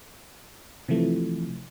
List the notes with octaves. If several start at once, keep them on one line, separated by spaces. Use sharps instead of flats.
C3 E3 F3 A3